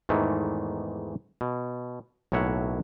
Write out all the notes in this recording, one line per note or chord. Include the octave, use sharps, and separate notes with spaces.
E2 G#2 D#3 E3 A3
B2
B1 A2 A#3 C#5 E5 F#5